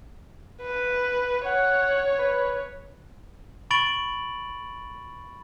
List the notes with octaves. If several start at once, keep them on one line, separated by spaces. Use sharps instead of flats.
B4
C#5 F#5
B4
B5 C#6 A6 D7 F#7